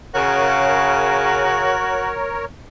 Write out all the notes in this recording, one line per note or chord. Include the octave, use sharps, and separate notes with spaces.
C#3 F#4 A#4 C#5